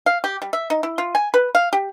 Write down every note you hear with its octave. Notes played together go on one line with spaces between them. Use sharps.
F5
G4
G3
E5
D#4
E4
F4
G#5
B4
F5
G4